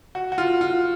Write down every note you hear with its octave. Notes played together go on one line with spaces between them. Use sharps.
F#4
F#4
F4
F4